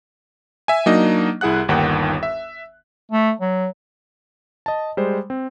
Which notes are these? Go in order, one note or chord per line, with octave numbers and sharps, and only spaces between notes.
E5 G#5
F#3 A#3 D4 D#4 D#5
C2 E4 G#4 F#5 F#6
G1 D#2 D#3 F#5 G5
E5
A3
F#3
D#5 A5
G3 G#3 C5
C4